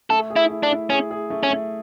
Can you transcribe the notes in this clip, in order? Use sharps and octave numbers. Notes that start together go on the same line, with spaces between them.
A3 A4
G#4
E4
E4
D4
E4
C#4 G#4
G#4
A3
C#4
A3